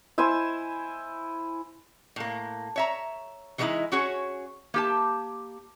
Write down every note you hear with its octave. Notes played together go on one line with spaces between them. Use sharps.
E4 C5 G#5 E6
A2 A#3
C#5 E5 A#5
E3 F#3 G#3 A3 D#4 E4
C#4 F#4 G#4 C#5
A#3 G4 A5